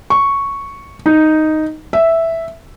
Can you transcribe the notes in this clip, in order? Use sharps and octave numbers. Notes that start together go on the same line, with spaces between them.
C#6
D#4
E5